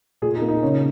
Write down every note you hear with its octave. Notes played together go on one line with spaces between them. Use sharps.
A#2 G#4
D#4
A#3
D#4
C#3 C#5